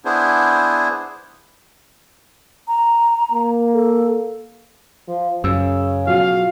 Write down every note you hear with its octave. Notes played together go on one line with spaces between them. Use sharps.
B3 D4 E4 G#4 C5
A#5
A#3
A4
F3
F#2 C#3 E6
B2 F3 F#3 F5